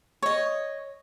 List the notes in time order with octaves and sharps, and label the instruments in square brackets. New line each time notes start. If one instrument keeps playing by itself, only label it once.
[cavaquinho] C#5 D#5